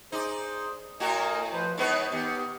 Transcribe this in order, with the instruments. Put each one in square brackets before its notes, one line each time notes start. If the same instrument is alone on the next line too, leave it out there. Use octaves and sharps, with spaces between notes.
[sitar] D#4 D5 [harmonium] G#4 C5
[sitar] A2 F#4 [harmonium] A#4 D#5 G#5
[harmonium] F3 B4 C5
[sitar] G#2 B3 B4 [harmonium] C#5 D#5
[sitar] D#3 [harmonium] B3 G4